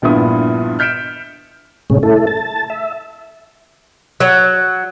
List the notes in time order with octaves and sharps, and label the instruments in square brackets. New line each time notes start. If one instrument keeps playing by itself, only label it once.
[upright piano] A#1 G2 A#2 B3 E4 D#6
F6 G6 B6 C#7 D7 E7
[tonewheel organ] A2 C3 G#3 C#4
A3 E4 A4
A5
E5
[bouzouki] F#3